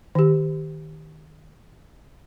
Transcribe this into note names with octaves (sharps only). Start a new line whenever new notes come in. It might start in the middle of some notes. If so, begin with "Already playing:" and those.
D#3 G4